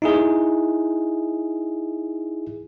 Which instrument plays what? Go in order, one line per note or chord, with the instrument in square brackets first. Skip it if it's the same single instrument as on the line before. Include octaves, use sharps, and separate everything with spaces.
[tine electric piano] D#4 E4 G#4